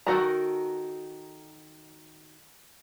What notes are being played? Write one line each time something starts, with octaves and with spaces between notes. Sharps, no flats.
D#3 F#4 A4 A#4 A#5